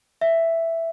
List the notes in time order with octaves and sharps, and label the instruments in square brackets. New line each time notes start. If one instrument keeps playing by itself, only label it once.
[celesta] E5